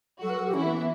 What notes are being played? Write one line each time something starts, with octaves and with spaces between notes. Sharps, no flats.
F#3 F#4 A4
B4
A4
G4
E3 C#4 E4
B3
B3